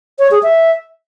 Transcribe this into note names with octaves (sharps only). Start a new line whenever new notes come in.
C#5
G#4
E5